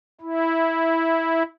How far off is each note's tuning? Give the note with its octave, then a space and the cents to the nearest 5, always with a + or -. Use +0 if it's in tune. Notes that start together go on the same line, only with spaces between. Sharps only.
E4 -10